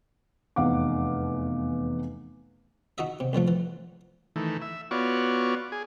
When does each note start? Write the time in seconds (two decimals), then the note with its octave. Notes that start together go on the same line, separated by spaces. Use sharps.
0.56 F1 E2 F5 F#5 D6
2.98 D#4 F#4 D#5 E5
3.20 C3
3.33 C2 D3 F3 A3
3.48 E3
4.36 D#3 E3 A3
4.62 E5
4.91 B3 F4 F#4 C#5 D5
5.72 G#4